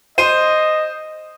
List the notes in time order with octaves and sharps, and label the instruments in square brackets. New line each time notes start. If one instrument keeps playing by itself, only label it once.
[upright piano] C5 D#7 [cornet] D#5